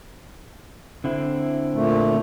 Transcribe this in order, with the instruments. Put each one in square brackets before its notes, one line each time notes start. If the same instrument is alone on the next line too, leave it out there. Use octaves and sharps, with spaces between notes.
[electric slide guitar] D3 C4 E4
[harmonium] A#2 A3